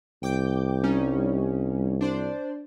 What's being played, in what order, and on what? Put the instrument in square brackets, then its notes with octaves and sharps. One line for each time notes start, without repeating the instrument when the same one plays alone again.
[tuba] C2 [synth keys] G5 D6 G6
[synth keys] G3 C#4 D#4
D4 C5 D5